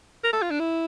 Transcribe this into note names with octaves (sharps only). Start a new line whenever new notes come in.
A#4
A4
F4
D4
E4